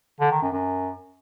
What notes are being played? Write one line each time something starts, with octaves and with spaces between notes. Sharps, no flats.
D3
D#3
F#2
F#2